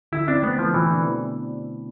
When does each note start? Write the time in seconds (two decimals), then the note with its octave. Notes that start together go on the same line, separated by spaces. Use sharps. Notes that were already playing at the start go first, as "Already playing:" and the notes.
0.12 D3 E4
0.28 C4 D4
0.43 A3 B3
0.59 F3 E4
0.74 B2 E3
0.90 D4